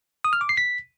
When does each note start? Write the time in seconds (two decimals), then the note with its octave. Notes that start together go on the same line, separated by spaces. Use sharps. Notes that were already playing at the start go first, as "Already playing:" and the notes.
0.25 D#6
0.33 F6
0.41 D6
0.49 C7
0.57 B6